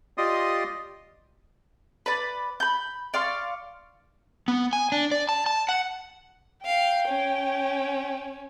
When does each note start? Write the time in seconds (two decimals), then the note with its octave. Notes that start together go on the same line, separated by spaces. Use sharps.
0.18 F4 G4 D5 D#5 C6 D#6
2.06 B4 D5 B5
2.60 B5 G6
3.14 D5 F5 C6 C#6
4.48 B3
4.73 G#5
4.92 D4
5.12 D5
5.29 A5
5.46 A5
5.69 F#5
6.65 F5 G5
7.08 C#4